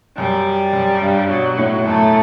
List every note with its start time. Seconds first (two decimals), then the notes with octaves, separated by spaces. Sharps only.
0.17 F#2 G3
0.73 F#2
1.02 G2
1.29 B2 F#3
1.57 A2
1.85 F#2 A3